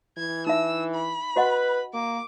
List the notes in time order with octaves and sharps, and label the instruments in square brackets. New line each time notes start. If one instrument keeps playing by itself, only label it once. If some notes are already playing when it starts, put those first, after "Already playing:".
[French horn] E3 [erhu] G#6
[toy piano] D#4 E5 [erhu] E6
[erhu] B5
[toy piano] F#4 D#5 F#5 [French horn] B4
[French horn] A#3 [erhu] D6